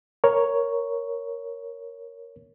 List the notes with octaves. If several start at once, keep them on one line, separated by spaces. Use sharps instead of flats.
A#4 C#5